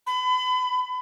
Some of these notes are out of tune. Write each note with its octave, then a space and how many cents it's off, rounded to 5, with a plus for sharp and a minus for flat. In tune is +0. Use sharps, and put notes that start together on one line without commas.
B5 +35